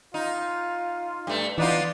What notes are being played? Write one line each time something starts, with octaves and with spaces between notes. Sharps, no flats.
D#4 F4
G2 A3
E3 B3 D4 D#4 F4